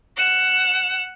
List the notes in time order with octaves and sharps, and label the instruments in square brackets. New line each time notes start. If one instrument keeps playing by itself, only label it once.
[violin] F#5 E7